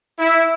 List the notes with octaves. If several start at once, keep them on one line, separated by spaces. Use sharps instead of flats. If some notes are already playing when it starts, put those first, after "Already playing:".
E4